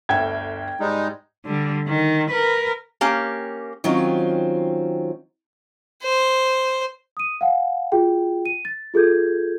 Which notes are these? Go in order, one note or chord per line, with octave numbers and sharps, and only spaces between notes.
G1 D2 E5 G5 G#6
G#2 G3 G#3 D#4
D3 G3
D#3
A#4 B4
A#3 C#4 G4
D#3 F#3 C4 C#4 F4
C5
D#6 D#7
F5 F#5 G#5
F4 F#4 G#4 G5
D#7
A6
F4 G#4 A4 G6 G#6